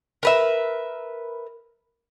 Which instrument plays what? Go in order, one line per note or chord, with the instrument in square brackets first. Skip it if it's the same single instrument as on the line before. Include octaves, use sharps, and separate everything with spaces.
[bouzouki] A#4 B4 E5